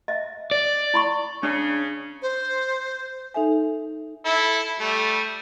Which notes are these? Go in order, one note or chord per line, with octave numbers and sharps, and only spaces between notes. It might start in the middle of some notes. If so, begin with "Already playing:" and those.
D#5 E5
D5
E4 B5 C#6
C#3 D4
C5
D#4 A4 E5 G#5
E4 A4
G3 A3